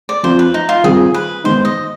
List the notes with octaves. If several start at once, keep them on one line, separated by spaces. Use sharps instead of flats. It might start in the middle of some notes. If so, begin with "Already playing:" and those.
D5
F3 C4 F4 C5
B4
D#4
F4
D#3 G3 C4 F4 G#4
B4
D#3 G#3 B3 D#4 C5
D#5